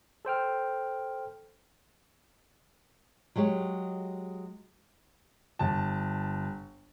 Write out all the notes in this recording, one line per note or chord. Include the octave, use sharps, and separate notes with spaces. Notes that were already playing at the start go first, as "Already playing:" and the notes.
A4 C5 G5 F6
F#3 G#3 G4 C#5
G1 A5